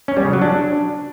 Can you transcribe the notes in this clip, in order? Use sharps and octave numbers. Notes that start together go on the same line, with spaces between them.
C#4
G3
C#3
F#3
D4